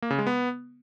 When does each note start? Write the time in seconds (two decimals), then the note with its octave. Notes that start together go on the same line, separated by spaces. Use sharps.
0.02 A#3
0.10 C#3
0.18 G#3
0.27 B3